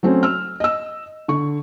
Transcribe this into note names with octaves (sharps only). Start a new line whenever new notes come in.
F#3 A3 C4 C#4
E6 F6
D#5 E6
D3 C#6